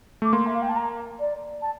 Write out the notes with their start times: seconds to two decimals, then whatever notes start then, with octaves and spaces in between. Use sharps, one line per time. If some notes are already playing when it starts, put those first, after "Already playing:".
0.22 A3 D6
0.32 A#3 C6
0.46 E5
0.54 F5
0.62 G5
0.69 A5
0.76 A#5
1.19 D5
1.62 A5